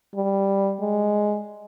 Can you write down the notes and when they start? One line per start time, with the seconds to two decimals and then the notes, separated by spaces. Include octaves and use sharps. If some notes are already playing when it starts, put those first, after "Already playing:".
0.15 G3
0.81 G#3